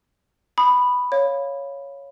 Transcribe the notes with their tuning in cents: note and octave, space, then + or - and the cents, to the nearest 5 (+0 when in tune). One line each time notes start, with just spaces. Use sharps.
B5 +0 D#6 -25
C#5 +0 F5 +0